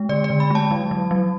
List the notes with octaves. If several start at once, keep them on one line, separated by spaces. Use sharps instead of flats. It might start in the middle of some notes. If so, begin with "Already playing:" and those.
Already playing: G#3
D3 D5
D5
D3
B5
G#3 A5
F#3
F#3
F#3